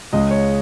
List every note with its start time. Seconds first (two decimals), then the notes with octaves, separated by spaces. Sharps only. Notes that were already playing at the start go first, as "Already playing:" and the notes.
0.13 C#2 C#3 G#3 D#5
0.31 C#5